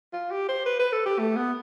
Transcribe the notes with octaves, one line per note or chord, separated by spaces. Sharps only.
F4
G4
C5
B4
B4
A4
G4
A3
B3